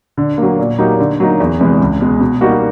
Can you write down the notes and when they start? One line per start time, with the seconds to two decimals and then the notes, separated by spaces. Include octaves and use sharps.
0.17 D3
0.38 F#3 A#3
0.59 A#2
0.78 F#3 A#3 D#4 G4
1.00 D3
1.20 F#3 A#3 D#4
1.40 E2
1.59 C3 E3 G#3
1.81 C#2
2.01 B2 G#3
2.20 B2
2.41 G3 A#3 D#4 F#4